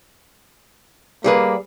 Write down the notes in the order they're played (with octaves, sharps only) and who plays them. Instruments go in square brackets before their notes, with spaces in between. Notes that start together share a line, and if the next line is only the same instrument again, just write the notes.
[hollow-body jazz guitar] G3 G#4 B4 [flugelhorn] A#3